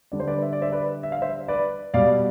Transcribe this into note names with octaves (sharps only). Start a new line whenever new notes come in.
D3 G3 D5
C5
B4 D5
E5
D5
C5 E5
B4 D5
E5
F5
C5 E5
B4 D5
B2 G3 D5 F5